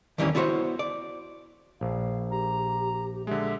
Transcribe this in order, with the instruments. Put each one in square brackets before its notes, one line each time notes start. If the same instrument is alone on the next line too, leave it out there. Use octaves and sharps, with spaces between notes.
[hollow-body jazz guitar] D#2 D#3 E3 G3 A#3 C#4
B3 E4 F#4 C5 C#5
D5
[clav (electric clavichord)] A#1 [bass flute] F5
[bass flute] G4 [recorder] A#5
[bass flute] G4
[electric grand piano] D3 G#3 [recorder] G4 [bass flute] E5